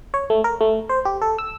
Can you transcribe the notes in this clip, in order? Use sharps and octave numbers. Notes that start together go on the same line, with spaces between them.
C#5
A3
A#4
A3
C5
G4
A4
E6